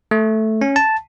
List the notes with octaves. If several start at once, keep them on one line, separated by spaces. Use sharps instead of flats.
A3
C#4
A5